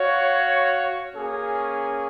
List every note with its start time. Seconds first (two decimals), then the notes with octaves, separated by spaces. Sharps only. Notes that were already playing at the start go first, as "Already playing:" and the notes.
Already playing: F#4 C#5 F5
1.14 A#3 C#4 G#4